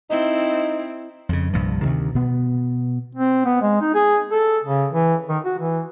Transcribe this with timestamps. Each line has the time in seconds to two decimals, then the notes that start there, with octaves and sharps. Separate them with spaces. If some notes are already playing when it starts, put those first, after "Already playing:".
0.10 C4 D#4 E4
1.29 F2 C#3
1.53 C2 G2 A#2 F3
1.83 D2 C3 D#3 E3
2.14 B2 B3
3.15 C4
3.45 B3
3.62 G#3
3.81 D#4
3.94 G#4
4.31 A4
4.63 C#3
4.93 E3
5.29 D#3
5.45 F#4
5.58 E3